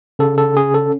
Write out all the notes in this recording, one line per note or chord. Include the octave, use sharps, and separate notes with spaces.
C#3 A4
A4
C#4 G#4
A4